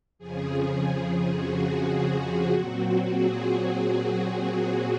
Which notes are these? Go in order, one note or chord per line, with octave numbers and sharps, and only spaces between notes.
F2 C#3 F3 G#4
F#4
F#4
F#4
A#2 F#3 C4
G#4